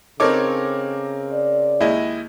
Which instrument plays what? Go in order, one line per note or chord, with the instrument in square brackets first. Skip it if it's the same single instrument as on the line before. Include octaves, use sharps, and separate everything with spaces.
[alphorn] C#3 [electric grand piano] C4 A#4 D6 [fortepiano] D#4 A4 C#5
[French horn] D5
[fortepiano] D#2 G#3 [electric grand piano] E4 D#5